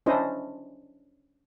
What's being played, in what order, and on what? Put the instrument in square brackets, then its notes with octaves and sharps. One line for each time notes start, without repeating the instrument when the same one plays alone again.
[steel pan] C#4 D4 E4 C5 D#5